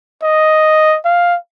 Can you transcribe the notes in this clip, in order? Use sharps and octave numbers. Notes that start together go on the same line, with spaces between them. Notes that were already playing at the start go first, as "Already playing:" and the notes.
D#5
F5